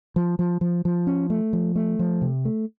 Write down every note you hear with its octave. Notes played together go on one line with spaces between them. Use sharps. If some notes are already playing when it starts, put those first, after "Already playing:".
F3
F3
F3
F3
C#4
A3
F3
A3
F3
C3
A3